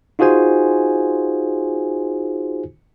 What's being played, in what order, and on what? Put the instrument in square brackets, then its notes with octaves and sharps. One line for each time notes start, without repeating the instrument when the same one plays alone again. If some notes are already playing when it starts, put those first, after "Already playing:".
[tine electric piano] D#4 F4 F#4 G#4 C5 G#5